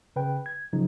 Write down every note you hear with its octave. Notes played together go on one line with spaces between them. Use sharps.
C#3 B4 G5
G#6
C#3 F3 F#3 D#4